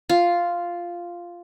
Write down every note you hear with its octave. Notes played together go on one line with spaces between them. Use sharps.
F4